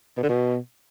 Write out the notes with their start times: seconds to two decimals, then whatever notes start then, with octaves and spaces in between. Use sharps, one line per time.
0.17 B2
0.23 D3
0.29 B2